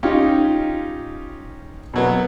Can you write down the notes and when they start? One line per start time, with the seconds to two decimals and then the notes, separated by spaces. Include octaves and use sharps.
0.03 C#4 D#4 F4 G4
1.94 B2 F#3 B3